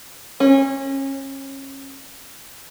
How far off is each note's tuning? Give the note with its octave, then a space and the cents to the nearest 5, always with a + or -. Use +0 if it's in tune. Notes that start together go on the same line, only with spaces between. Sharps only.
C#4 -30